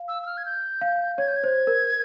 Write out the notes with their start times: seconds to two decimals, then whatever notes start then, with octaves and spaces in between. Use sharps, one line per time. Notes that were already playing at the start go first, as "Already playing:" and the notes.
Already playing: F5
0.08 E6
0.23 E6
0.26 F6
0.37 G#6
0.46 G6
0.81 F5
1.18 C#5 G#6
1.28 G6
1.36 G#6
1.44 C5
1.67 A#4